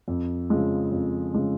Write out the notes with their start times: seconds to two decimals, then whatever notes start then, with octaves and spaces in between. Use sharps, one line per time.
0.08 F2
0.50 C#3 F3 G#3
0.92 F2
1.34 C#3 F3 G#3